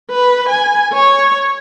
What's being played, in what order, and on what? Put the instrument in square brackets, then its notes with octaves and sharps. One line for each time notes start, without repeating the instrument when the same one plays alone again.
[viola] B4
G#5
C#5